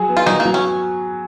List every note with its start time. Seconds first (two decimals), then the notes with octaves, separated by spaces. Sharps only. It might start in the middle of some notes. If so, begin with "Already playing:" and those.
Already playing: F#3 F#4 G#4
0.09 B3
0.17 F4
0.26 D#3 F#3 D#4
0.40 A#3
0.45 F#3
0.54 C#4